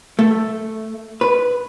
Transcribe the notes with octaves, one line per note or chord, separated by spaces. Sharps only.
A3
B4